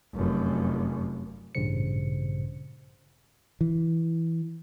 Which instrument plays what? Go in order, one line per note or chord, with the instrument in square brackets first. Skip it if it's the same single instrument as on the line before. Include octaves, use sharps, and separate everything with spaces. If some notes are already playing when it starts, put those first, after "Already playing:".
[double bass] F1 F#2
[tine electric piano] A1 G2 A#2 C#3 C5 C#7
[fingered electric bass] E3